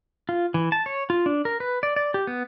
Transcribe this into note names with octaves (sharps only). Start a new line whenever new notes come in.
F4
E3
A5
C#5
F4
D4
A#4
B4
D5
D5
G4
B3